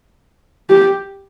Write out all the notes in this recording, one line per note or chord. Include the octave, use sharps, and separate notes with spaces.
G4